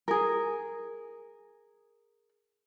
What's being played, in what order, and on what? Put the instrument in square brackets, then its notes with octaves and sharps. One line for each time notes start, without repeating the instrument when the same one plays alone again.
[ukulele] G#4 A#4